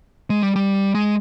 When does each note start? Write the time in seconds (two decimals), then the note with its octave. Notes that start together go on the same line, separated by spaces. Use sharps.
0.30 G#3
0.43 G3
0.56 G3
0.95 G#3